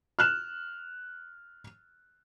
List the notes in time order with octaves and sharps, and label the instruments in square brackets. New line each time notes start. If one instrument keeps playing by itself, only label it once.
[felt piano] F6 F#6 E7